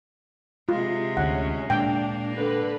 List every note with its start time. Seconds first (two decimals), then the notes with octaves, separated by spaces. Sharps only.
0.69 C3 G#3 F4
1.17 D2 D3 C#4 F#5
1.70 A#2 G#3 A#3 D4 G5
2.34 D3 B4